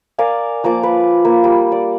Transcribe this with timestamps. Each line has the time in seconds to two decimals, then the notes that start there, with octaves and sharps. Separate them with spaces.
0.18 A#4 D5 F5 G#5
0.64 F3 A#3 D5 D6
0.83 B4
1.25 A#3
1.44 G3
1.72 D5